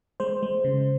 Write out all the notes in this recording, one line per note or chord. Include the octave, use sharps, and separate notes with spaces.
G#3 C5
G#3
C#3